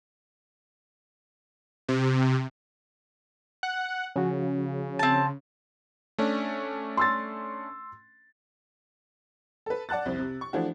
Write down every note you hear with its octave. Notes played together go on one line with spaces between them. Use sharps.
C3
F#5
C#3 F3 F#4
C4 A5
A3 C#4 D4
C6 E6 A6
A4 B4
D5 F#5 A5 F#6 A6
C2 F2 C4
C3
C#6
E3 F3 A3 D4 F#4